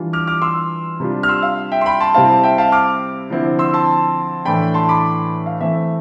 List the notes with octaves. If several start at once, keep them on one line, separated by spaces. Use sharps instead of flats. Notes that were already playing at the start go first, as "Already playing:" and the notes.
Already playing: E3 G3 D4 F4
D6 F6
D6 F6
C6 E6
C3 G3 D4 F4
F6
C6 E6
F5
E5 G5
C6
G5 B5
A5 C6
C3 G3 C4 E4 F5 A5
E5 G5
F5 A5
D6 F6
D3 F3 C4 E4
C6 E6
A5 C6
A2 E3 A3 D4 G5 B5
A5 C6
B5 D6
F5
E3 A3 C4 E5